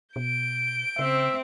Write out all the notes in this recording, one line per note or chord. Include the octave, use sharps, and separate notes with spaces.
B2 G6 D7
C#3 C4 E5